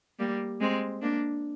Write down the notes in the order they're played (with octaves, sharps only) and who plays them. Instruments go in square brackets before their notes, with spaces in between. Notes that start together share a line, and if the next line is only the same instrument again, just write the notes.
[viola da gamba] G3 A#3
G#3 C4
A#3 D4